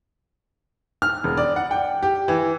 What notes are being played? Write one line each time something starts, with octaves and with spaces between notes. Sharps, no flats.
F6
E1
D5
F#5
G5
G4
E3